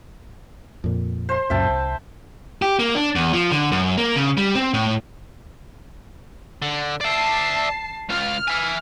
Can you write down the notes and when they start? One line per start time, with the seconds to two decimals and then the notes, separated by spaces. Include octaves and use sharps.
0.84 F2 A#2
1.29 C5 C6
1.50 C#2 F#2 A#2 E5 G5 A5
1.69 C2
2.62 G4
2.79 A#3
2.95 D4
3.16 E2
3.33 F3
3.52 D3
3.72 F#2
3.98 A#3
4.16 C#3
4.38 G3
4.55 C4
4.74 A2
6.62 D3
7.01 D5 E5 A5 C7
8.09 C#2 F4 F6
8.48 E5 G#5